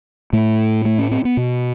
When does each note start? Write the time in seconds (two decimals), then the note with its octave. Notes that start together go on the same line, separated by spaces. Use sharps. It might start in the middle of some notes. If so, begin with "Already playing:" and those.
0.33 A2 A3
0.85 A3
0.99 C#4
1.11 C4
1.25 B3
1.37 B2